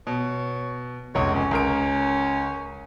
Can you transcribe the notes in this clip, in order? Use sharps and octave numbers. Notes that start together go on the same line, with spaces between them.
B2 C#5
F1 C#2 C#5
C#4
C#2 A#4 D7